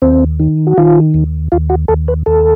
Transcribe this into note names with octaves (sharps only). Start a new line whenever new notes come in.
D#2 C4
D#3
F#4
D#3 F4
D#2
D#2 F4
F#4
D#2 A4
B4
D#2 A4